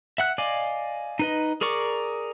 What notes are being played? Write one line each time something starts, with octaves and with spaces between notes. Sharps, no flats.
E5 F#5 F#6
D5 D#5 F5 G#5 D6
D#4 B4 D#5
G#4 A#4 D5 C#6 D6